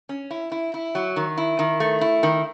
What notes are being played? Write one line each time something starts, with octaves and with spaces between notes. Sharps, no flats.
C#4
E4
E4
E4
F#3
D#3
E4
D#3
A3
E4
D#3